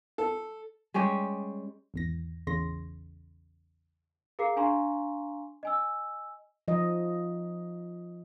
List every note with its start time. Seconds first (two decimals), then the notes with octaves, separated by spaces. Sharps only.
0.18 A4
0.94 G3 G#3 C#4 G4
1.94 G#1 E2 A#6
2.47 A1 E2 C#3 C6 A#6
4.39 G#4 A#4 F5 A#5 D6 C7
4.56 D4 F5 G#5 A#5 C6 C#6
5.63 D#5 G#5 E6
6.68 F3 D#5